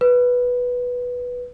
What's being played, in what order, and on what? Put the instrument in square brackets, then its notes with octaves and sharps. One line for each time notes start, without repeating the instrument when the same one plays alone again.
[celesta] B4